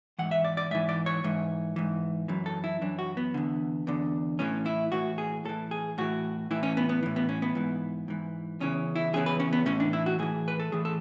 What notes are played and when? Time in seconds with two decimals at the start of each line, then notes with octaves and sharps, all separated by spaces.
0.18 G#2 E3 F#5
0.31 E5
0.45 D5
0.57 D5
0.71 G#2 E3 E5
0.89 D5
1.06 C#5
1.24 G#2 E3
1.76 G#2 E3
2.28 F#2 E3
2.46 A4
2.64 E4
2.81 F#2 E3 D4
2.99 F#4
3.17 B3
3.34 E2 D3
3.87 E2 D3
4.39 A2 E3 C#4
4.66 E4
4.92 A2 E3 F#4
5.18 G#4
5.45 A2 E3 A4
5.71 G#4
5.98 A2 E3 F#4
6.51 A2 E3 E4
6.63 C#4
6.77 B3
6.89 B3
7.03 A2 E3
7.16 B3
7.29 C#4
7.42 B3
7.55 G#2 E3
8.08 G#2 E3
8.60 E2 C#3 E3 C#4
8.96 E4
9.13 E2 C#3 E3 G#4
9.26 B4
9.40 C#4
9.53 B3
9.66 A2 E3 C#4
9.80 D4
9.93 E4
10.06 F#4
10.19 A2 E3 G#4
10.48 B4
10.60 A4
10.72 A2 E3 G#4
10.85 A4